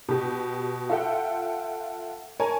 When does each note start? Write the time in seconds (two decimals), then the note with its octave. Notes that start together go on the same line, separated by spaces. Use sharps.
0.08 B2 G4
0.89 F4 A4 E5 F#5 G5
2.40 A#4 C#5 G#5 A5